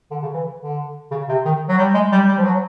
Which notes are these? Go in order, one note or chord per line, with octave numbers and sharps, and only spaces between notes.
D3
C#3
E3
D3
C#3
C3
D#3
F#3
G3
G#3
G3
G3
F3
F#3